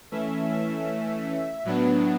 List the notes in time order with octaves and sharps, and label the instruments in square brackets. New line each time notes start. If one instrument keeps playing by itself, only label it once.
[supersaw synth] E3 A3 C#4 E5
E5
A2 F#3 B3 D4